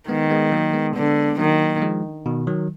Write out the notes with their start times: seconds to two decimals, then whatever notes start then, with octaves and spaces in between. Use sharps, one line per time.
0.08 D#3 G#3 B3
0.31 G#3 B3
0.52 F#3 A#3
0.74 G#3 B3
0.95 D3 G#3 B3
1.38 D#3 F#3 A#3
1.77 A#3
1.82 F3 G#3
2.26 B2 D#3
2.47 D#3 F#3